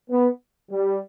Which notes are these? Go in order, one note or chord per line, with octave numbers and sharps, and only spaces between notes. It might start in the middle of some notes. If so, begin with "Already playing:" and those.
B3
G3